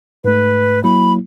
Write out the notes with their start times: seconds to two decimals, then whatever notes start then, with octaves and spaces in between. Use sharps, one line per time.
0.24 G#2 A3 B4
0.84 F#3 A#3 E4 B5